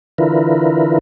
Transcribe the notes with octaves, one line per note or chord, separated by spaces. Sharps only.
D3 E3 E4 F4 A#4 B4